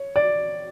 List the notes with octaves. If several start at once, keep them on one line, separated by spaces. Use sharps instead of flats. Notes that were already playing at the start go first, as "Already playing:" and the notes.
Already playing: C#5
D5